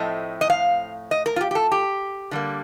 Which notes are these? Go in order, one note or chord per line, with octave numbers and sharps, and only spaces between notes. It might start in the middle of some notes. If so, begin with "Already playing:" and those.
Already playing: A2 F3 A3 C4 D#5
D#5
F5
D#5
A#4
F4
G4
G4
A4
G4
D3 G3 A#3